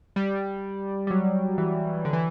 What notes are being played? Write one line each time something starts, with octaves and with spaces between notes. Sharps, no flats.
G3
G3
F#3
E3
D3
E3